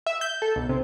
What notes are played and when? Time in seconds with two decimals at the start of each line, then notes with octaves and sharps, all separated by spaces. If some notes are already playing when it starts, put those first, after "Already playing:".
0.06 E5
0.21 G6
0.42 A4
0.56 B1
0.69 C3